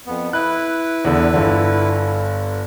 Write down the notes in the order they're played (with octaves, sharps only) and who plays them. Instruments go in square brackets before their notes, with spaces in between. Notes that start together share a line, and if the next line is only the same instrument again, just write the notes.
[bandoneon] F2 B3
[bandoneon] E4 B4 [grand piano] F#6
[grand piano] E2 D3
G1 D3